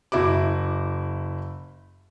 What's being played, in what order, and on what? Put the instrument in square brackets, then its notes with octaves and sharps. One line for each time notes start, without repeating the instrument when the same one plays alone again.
[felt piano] F#1 E4 F#4 D6